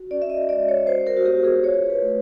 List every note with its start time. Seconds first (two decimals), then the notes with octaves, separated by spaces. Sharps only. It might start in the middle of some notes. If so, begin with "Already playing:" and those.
Already playing: F#4
0.11 C#4 D5
0.22 E5
0.30 D#5
0.49 G#3 D5
0.69 C#5
0.87 F#4 C5
1.07 A#4
1.17 F#4
1.26 B3 G4
1.44 G#4
1.64 F4 C#5
1.90 B4
2.03 A3